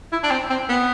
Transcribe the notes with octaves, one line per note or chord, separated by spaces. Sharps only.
E4
D4
C4
C4
B3